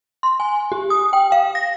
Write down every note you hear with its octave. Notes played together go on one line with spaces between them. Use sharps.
C6
G#5
G4
D#6
G5
F5
A#6